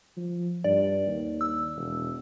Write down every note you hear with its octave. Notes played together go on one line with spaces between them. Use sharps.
F3
G2 D5
D#2
E6
E1